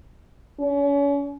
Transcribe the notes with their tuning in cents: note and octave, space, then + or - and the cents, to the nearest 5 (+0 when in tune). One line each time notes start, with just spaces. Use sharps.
C#4 +35